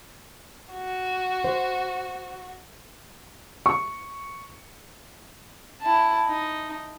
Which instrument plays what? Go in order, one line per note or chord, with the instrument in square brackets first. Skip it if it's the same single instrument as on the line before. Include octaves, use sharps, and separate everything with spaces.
[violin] F#4
[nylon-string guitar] C5
[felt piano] C#6
[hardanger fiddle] E4 A5
D#4